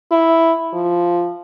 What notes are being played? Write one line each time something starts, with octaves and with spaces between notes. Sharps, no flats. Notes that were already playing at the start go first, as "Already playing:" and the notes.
E4
F3